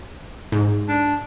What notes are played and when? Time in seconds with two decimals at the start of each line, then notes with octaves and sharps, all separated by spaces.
0.52 G#2
0.88 D4